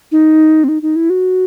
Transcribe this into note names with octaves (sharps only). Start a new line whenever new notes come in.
D#4
C4
D#4
D#4
E4
F#4